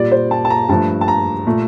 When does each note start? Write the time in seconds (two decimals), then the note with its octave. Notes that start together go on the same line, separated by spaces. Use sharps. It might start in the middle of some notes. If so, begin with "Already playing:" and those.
Already playing: A#2 G3 D5
0.12 C5
0.31 A5
0.45 A5
0.50 A#5
0.69 G2 F3 A3 A5
1.01 A5
1.08 A#5
1.47 A#2 A3